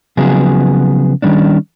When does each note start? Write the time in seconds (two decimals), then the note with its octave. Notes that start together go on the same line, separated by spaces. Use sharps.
0.17 C#3 F3 F#3 B3 F#4 G#4
1.22 D#3 G3 C#4 D4